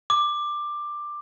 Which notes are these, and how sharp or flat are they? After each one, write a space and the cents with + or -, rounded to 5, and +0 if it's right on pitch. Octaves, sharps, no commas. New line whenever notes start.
D6 +15